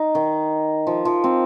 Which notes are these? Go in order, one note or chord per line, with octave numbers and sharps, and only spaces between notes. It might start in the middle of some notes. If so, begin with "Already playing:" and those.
Already playing: D#4
D#3
F3
F3
C4